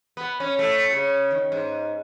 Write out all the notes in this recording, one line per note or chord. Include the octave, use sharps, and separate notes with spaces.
B3
C#4
A3
C#3
D#3
G#2